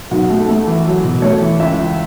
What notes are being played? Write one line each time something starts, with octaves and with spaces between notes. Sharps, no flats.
B1 F#4
A3
A3
E3
F#3
B2
A3 C#5
E3
C#2 E5
E3